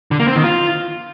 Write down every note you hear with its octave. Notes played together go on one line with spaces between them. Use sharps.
D3
A#3
C4
D#3
F4